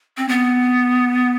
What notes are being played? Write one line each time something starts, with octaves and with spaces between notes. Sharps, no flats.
C4
B3